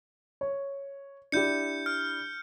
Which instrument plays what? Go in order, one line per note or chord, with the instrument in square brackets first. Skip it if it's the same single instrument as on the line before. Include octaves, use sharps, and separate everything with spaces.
[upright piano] C#5
[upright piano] D4 E4 G4 [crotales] G6 C#7
[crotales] F6